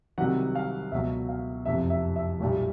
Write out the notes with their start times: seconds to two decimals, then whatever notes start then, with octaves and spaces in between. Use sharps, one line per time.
0.18 C2 C3 D#3 F#3 F#5
0.55 F5
0.92 C#2 B2 F#3 E5
1.29 F5
1.66 F#1 F2 C3 E5
1.90 E5
2.16 E5
2.40 B1 A#2 G3